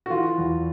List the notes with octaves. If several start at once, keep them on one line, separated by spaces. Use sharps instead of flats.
F#4
E3 F4
E2